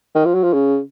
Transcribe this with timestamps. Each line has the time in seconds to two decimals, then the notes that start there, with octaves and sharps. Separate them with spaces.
0.15 D#3
0.25 F3
0.34 F#3
0.43 F3
0.53 C#3